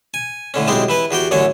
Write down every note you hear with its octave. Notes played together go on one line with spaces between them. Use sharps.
G#5
A2 D3 C#4
B1 G#3 C4 E4 G4
E3 E4 B4
E2 F#4 G4 G5
A1 F#2 D3 C#4 C#5